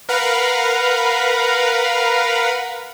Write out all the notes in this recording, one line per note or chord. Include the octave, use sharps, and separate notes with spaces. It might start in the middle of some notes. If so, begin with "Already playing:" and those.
A#4 B4 F5 F#5 A#5 B5